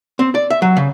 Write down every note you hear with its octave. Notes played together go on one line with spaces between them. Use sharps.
C4
D5
E5
F#3
C#3